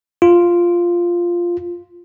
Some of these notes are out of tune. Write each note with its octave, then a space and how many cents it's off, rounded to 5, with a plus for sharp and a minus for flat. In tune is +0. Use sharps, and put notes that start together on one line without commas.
F4 -5